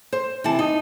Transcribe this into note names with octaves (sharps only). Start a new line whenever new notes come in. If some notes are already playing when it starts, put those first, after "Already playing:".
C5
C3 E3 A5
D#4